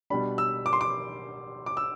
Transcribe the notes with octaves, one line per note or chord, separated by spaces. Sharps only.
B2 G3 D4 B5
E6
D6
C6
D6
D6
E6